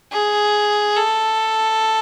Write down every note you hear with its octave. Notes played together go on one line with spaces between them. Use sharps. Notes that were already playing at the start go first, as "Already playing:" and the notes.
G#4
A4